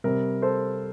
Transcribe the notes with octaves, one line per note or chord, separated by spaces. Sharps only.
C3 G3 C4 A#4
A4 C5